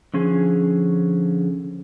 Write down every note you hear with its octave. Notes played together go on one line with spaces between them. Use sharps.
D3 F3 C#4 G#4